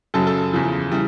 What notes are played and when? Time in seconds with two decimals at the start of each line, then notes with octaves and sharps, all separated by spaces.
0.14 F#2 C#3 F#3 A4 A5
0.27 A4 A5
0.53 E2 C#3 F3
0.91 C#3 E3 G3